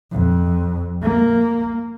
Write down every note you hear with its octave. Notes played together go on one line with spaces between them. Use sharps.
F2
A#3